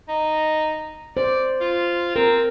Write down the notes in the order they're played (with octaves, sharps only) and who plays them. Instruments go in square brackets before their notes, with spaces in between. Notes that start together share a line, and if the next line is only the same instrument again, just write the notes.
[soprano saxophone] D#4
[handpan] C5 [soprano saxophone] D5
[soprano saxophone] F4
[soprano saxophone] C4 [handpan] A#4